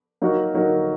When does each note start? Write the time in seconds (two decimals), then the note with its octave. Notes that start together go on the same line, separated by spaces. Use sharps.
0.22 F#3 A#3 D#4 F#4 A#4
0.55 F#3 A#3 D#4 F#4 A#4